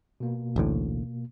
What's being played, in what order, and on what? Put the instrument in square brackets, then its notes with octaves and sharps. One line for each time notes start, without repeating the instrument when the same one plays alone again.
[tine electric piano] B2 A#3
[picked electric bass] A1 D2 A2